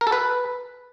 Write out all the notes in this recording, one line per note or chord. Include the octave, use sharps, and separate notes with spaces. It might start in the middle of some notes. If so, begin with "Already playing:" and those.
A#4
A4
B4